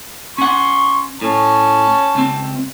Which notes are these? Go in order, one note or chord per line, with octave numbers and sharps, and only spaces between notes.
C#4 F#5 C6 C#6
A2 C#4 A5
C#2 C4